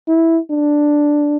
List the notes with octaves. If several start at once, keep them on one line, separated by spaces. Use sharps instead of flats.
E4
D4